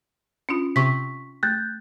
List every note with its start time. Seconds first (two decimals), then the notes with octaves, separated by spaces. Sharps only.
0.49 C#4 D4 F4
0.76 C3 C#6 B6
1.43 A3 F#6 G6 A6